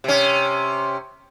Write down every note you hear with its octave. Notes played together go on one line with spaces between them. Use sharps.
C3 C#4